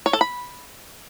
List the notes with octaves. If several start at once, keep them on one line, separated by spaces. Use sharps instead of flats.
C#5
A4
B5